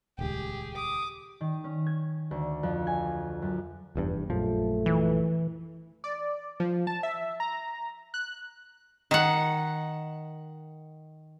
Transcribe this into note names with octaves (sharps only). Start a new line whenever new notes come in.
D#1 C#2 G4 G#4
D6 D#6
D#3
C#4
G#6
D2
F2
G#5
F#2
F1 E2 G2
A#1 F#2 F3 A3
E3
D5
F3
A5
E5
A#5
F#6
D#3 F#5